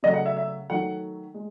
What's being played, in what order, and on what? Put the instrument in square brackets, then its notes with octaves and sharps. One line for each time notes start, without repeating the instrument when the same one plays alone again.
[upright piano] C#3 F#3 A3 D#5
F#5
E5
E5
D#3 F#3 A3 F#5
G#3